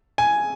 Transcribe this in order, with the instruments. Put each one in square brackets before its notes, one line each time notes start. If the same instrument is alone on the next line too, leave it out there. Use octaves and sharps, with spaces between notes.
[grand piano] G#5